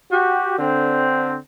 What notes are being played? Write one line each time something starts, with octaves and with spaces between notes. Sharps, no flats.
F#4 G4
D3 C4